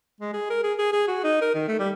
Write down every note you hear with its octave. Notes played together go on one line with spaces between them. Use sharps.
G#3
G#4
A#4
G#4
G#4
G#4
F#4
D#4
A#4
D#3
A3
G3